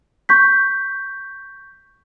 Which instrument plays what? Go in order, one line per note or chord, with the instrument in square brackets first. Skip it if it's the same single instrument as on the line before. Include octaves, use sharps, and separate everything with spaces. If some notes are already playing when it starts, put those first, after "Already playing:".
[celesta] C#6 G6 B6